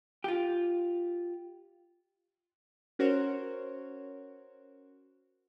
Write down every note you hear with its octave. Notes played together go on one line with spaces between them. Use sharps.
F4 G4
C#4 F#4 A#4 C5 C#5